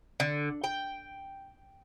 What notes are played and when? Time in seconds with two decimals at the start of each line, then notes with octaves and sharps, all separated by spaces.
0.20 D3
0.64 G5